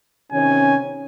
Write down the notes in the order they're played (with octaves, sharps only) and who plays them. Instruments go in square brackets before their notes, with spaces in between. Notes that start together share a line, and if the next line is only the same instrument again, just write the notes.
[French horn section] C3 D#3 C#4 [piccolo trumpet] G#5